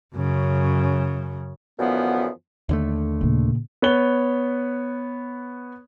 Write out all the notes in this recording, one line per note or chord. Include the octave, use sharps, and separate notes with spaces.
F#2 C#3
F#2 D3 E3 F3 B3
D#2 D3 A3
A#2 C#3
B3 C#5 G7